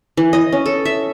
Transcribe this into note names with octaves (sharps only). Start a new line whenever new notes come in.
E3
D#5
C#4
A4
E5